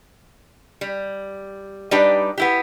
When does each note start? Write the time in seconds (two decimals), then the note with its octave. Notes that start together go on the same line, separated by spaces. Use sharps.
0.81 G3
1.91 G3 D4 D#4 G4 B4 D5
2.38 B3 E4 G4